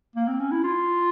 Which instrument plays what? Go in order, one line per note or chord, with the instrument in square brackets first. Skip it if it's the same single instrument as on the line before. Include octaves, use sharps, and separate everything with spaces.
[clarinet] A#3
C4
C#4
E4
F4